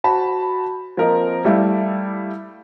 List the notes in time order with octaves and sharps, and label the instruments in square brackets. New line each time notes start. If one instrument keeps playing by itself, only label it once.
[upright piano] F#4 C5 A5 B5
F3 A#3 C4 A#4 D#5
G3 A3 E4 D5 F5